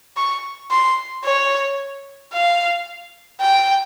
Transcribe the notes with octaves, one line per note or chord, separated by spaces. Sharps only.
C#6
C6
C#5
F5
G5